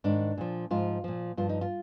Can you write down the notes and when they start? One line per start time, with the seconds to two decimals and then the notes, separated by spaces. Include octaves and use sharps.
0.04 G#2 D#3 D4
0.37 A#2 F3
0.71 G#2 F3 F4
1.04 A#2 F3
1.37 G2 F3 F4
1.49 D#4
1.61 F4